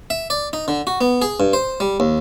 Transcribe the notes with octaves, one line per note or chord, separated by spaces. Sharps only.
E5
D5
D#4
D3
F#4
B3
G#4
G2
C5
G3
D#2